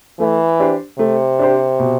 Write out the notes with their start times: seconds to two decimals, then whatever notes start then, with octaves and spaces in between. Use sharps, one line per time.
0.20 E3 A3
0.60 D4 G4 C5
0.99 C3 A3
1.39 D4 G4 C5
1.79 B2